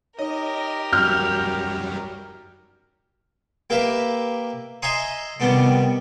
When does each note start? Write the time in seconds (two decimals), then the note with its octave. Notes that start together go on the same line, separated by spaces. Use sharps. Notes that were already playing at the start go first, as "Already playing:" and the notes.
0.19 D#4 G4 A#4 C#5 D#5
0.93 F#2 F#3 G3 F#4 G5 F6 G6
3.70 A#3 G4 A#4 B4 E5
4.82 D#5 E5 G#5 A#5 C6 D#6
5.40 C3 D#3 G3 B3 D4